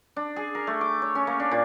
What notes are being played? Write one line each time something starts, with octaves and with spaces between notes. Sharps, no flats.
D4
G#4
A#4
A3
D6
C#5
C#4
A#3
D4
A#2